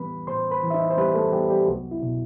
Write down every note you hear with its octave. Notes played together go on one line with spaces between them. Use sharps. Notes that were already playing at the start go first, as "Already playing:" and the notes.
Already playing: A2 E3 G3 B3 B4 B5
A2 C5 C6
B4 B5
E3
E5
D#4 D#5
C5
G3 B3 B4
A3 A4
G3 B3 G4
G3 G4
C2 F#3 F#4
E4
B2